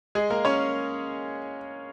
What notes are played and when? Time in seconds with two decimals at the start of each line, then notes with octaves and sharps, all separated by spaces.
0.15 G#3 G#4
0.30 A#3 A#4
0.45 C#4 C#5